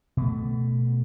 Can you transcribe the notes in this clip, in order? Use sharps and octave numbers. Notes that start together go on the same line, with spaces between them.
B2 A3